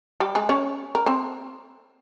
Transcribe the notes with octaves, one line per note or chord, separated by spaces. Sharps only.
G3 G4
G#3 G#4
C#4 C#5
A#4
C4 C5